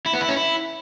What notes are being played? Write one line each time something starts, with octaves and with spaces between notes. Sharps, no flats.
E4
B3
E4
C#4
E4